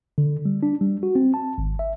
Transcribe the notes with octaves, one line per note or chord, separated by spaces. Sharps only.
D3
G3
D4
G3
F#4
C4
A5
G#1
E5